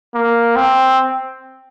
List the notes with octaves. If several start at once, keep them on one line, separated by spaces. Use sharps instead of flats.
A#3
C4